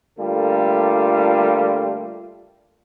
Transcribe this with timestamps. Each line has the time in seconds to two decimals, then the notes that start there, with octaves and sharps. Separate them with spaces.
0.19 D3 G3 A3 A#3 F4 A4